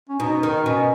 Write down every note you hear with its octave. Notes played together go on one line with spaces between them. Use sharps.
C#4
B2 D#4
D#3
B2 C#4